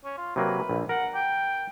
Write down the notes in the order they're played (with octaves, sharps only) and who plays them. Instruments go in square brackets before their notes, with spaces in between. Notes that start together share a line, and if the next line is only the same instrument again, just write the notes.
[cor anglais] C#4
F4
[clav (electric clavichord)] C3 F#3 A#3 [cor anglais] B4
[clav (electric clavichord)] A#1
[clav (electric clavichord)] A#4 [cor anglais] F#5
[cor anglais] G5